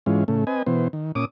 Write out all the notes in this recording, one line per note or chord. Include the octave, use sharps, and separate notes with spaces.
G#2 E3 G#3 C#4 F4
A2 C#3 A3
C4 B4 D#5 G#5
B2 E3 B3 C5
D#3
A#2 C#4 D6 D#6